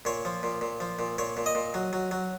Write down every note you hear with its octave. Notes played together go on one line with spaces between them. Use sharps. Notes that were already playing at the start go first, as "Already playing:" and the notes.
A#2 C#5
F3
A#2
A#2
F3
A#2
A#2 C#5
A#2
D#5
A#2
F#3
F#3
F#3